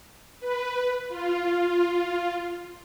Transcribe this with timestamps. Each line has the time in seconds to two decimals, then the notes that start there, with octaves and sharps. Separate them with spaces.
0.40 B4
1.09 F4